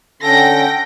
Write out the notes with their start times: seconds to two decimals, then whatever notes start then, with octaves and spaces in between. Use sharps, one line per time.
0.22 D3 C#4 A4 G5 A#6